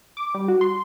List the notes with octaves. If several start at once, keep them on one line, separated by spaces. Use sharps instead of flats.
D6
G3
F#4
C6